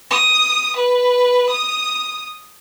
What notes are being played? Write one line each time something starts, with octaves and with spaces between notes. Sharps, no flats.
D#6
B4
D#6